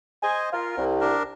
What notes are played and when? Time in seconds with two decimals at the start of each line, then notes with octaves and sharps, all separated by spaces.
0.23 C5 D#5 G#5
0.53 F4 A#4
0.78 C2
1.01 D4 A#4